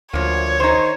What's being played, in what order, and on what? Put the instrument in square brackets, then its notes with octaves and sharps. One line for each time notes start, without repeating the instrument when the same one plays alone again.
[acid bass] D2 [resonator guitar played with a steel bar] F3 A#3 [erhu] C#5
[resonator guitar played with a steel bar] D#3 D#4 [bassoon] C5